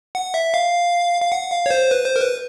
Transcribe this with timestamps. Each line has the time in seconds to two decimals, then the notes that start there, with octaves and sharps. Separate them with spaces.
0.15 F#5
0.34 E5
0.54 F5
1.22 F5
1.32 F#5
1.52 F5
1.66 C#5
1.71 C5
1.91 B4
2.05 C5
2.16 A#4
2.21 B4